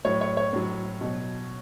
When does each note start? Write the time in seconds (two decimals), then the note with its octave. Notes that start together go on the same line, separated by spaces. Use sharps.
0.05 A2 F#3 C#5
0.21 C#5
0.37 C#5
0.53 A2 F#3
1.01 B2 F#3